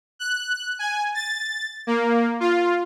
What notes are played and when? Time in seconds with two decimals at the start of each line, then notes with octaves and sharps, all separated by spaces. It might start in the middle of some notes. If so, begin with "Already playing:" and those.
0.19 F#6
0.79 G#5
1.15 A6
1.87 A#3
2.40 F4